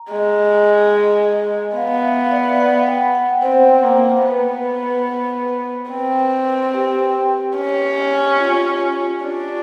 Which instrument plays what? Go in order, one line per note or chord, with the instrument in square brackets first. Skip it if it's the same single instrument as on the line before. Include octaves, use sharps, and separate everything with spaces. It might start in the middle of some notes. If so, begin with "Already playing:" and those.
Already playing: [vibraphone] A#5
[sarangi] G#3
[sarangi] B3 [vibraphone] F5
[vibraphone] E5
D5
F#5
G5
F#5
[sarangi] C4 [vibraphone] C5
[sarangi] A#3
[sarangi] B3 [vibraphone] B4
[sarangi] C4
[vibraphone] G4
[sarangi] C#4
[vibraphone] F4
[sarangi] D4